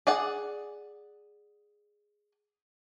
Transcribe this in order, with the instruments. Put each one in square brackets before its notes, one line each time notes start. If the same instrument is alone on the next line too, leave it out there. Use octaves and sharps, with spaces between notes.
[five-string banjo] G#4 D5 F#5